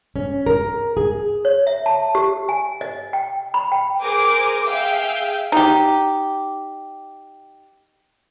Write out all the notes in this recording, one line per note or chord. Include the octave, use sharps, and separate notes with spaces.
C#4
A#4
G#4
C#5
E5
A5
G4
G#5
D#5
G5
B5
G5
G#4 A#4 C5 G#5 D6
G#4 E5 F5 G5
D#4 G4